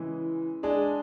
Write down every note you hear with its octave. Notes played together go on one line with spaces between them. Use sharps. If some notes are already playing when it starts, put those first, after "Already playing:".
Already playing: C#3 E3 G#3
G#3 D4 G#4